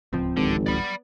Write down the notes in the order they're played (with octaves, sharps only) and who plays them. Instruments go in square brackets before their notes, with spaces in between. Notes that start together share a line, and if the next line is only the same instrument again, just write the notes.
[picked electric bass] D1 C#2 F3 [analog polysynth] C4
[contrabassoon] G#1 [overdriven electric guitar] D3
[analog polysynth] B3 [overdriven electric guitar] D5 B5